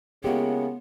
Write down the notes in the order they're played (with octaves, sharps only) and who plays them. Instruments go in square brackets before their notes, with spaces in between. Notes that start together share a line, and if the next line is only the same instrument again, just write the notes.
[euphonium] C#3 [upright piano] G#3 E4 F#4 [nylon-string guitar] A#3 G4 [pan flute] B3